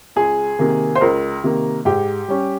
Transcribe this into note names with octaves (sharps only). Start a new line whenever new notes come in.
C#2 G#4
C3 D#3 A#3
C5
C#2 A#4
C3 D#3 A#3
G#2 G4
G3 C#4